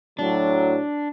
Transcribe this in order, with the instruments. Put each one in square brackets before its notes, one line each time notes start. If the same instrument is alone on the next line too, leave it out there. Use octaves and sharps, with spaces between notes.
[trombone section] A2 F#3 [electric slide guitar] D4